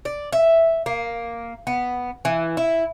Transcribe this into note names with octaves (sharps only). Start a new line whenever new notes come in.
D5
E5
A#3
B3
E3
E4